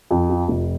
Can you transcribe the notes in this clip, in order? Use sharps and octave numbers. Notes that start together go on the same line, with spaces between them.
F2
F3
F1